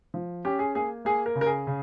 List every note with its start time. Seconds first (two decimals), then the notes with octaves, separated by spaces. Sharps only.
0.14 F3
0.45 C#4 G4
0.59 G#4
0.75 A#3 G#4
1.05 A#3 G#4
1.26 A#4
1.35 C#3
1.41 A#4
1.46 G#4
1.67 C#3